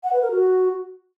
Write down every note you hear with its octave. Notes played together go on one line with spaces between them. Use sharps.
F#5
B4
A#4
F#4